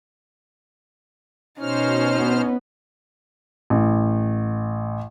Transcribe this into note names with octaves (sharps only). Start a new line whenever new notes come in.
B2 C#4 D#4 C5 F6
B3
A1